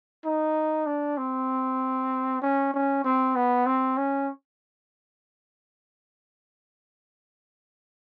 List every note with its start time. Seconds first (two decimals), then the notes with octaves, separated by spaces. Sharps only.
0.25 D#4
0.86 D4
1.18 C4
2.42 C#4
2.74 C#4
3.04 C4
3.36 B3
3.66 C4
3.97 C#4